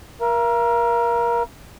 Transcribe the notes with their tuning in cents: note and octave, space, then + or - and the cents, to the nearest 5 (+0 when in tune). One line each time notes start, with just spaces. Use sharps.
A#4 +25 F5 -45